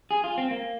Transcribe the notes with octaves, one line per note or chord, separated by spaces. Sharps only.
G#4
F4
C4
A#3